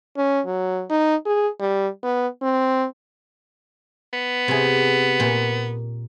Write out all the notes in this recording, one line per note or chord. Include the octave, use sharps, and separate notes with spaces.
C#4
F#3
D#4
G#4
G3
B3
C4
B3
C3 G#4
A#2